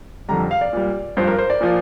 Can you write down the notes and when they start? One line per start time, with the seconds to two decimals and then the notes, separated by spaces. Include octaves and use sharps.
0.29 F2 D3 G3 A#5
0.51 F5
0.61 D5
0.73 A#2 G3
1.17 G2 F3 C5
1.27 A#4
1.38 C5
1.50 D5
1.61 A#2 F3